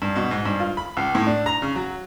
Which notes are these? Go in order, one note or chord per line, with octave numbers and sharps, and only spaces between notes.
G2
B2
G#2
G2
F4
B5
C#2
A2
D4
A#5
C#3
F#3